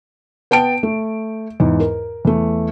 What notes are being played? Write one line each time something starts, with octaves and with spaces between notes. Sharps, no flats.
B3 G5 A5 D7
A3
E2 G#2
A#4
E2 A3